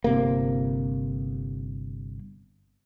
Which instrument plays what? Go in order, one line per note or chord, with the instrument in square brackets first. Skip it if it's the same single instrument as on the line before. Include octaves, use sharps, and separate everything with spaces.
[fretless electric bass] G1 C3 A#3